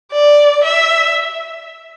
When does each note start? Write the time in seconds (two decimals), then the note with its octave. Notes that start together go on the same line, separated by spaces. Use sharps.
0.12 D5
0.64 E5